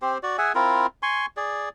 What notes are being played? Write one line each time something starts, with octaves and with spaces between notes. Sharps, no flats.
C4 G4 C5
F#4 D5
G#4 E5 F#5 G#5
C4 E4 F4 A#4
G#5 C6 C#6
G#4 D5